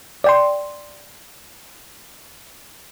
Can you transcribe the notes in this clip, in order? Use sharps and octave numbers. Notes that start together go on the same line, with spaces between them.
D5 G5 C6